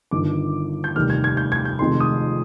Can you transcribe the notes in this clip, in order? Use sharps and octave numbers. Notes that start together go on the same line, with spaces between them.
G1 G2 D#3 D6
G6
F1 D#2 D#3 G3 F6
G#6
G#6
G6
G#6
G6
F1 F2 D#3 G#3 C6
D#6